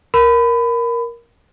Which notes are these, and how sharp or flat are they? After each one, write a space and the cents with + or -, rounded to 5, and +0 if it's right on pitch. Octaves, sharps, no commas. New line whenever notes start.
A#4 +10 B5 +25